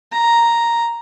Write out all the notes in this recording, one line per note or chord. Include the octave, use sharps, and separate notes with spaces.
A#5